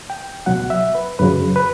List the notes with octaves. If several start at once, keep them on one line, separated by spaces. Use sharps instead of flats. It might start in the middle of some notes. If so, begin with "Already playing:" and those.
G5
C#2 B2 F#3 F#5
E5
B4
F#2 C#3 F#3 B4
B4